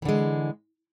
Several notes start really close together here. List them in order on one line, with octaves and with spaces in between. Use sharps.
E3 D3 G#3